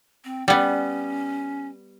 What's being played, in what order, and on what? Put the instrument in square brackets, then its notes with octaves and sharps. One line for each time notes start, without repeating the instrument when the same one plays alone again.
[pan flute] C4
[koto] G3 B3 [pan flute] C#4